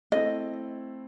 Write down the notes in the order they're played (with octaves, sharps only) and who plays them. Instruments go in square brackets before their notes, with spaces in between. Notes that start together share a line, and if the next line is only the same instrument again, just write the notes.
[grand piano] A3 C4 E4 A4 [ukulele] D#5